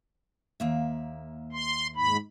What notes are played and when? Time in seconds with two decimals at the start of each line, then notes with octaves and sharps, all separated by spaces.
0.60 D#2 A#3 E5
1.52 C6
1.96 G#2 B5